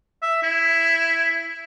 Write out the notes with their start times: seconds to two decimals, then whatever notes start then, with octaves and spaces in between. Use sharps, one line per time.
0.22 E5
0.43 E4